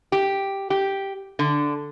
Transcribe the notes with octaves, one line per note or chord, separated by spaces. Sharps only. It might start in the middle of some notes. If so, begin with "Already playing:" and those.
G4
G4
D3